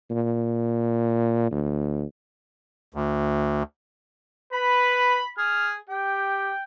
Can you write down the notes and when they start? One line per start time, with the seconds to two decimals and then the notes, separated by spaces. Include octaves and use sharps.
0.11 A#2
1.51 D2
2.94 D2
4.53 B4 B5
5.38 G#4 F6
5.89 G4 G5